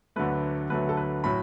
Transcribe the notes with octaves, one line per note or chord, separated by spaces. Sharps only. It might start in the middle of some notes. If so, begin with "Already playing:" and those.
D2 D3 F#3 A3 B4
D2 D3 F#3 A3 B4
A4
B4
A2 F#3 B5